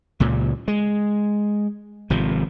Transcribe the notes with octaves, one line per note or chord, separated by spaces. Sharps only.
C#2 A#2 C#3
G#3
G#1 C3 F3